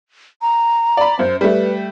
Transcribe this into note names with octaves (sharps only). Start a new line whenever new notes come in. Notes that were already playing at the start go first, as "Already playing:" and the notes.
A#5
D5 B5
F#2 C5
G3 A3 B4